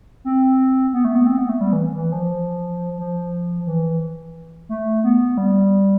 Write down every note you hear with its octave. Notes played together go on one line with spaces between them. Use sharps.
C4
B3
A3
B3
C4
B3
A3
G3
E3
E3
F3
F3
E3
A3
B3
G3